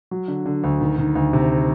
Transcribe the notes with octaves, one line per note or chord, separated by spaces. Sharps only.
F#3
D3
D3
D2
D#3
D#3
D2
C3